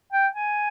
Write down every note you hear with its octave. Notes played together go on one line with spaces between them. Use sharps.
G5
G#5